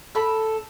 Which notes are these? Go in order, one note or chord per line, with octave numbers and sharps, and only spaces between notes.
A4 B5